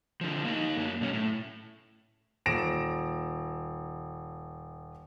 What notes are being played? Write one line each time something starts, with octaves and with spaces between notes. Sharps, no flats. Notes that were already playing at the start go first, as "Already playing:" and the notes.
D3 F3
A#3 D#4
F#2 A#3
B1 C#4
A2
D#1 A#6 D7 E7